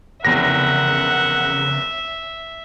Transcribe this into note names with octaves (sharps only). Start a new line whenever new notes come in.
F1 E2 C#3 A#4 E5 F#5 A#6